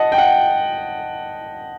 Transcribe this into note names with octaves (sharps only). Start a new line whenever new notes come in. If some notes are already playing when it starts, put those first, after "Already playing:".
Already playing: D#5 F#5 A5
G5
F#5